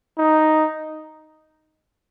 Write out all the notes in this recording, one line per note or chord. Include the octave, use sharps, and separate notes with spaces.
D#4